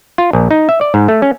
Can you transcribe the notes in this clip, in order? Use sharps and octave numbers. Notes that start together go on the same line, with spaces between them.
F4
A#1
D#4
E5
D5
G#2
A3
C#4